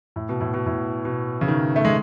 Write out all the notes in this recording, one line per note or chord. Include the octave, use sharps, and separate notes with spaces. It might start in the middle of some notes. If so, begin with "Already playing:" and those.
A2
B2
A2
B2
A2
B2
C#3
D#3
A3
G#3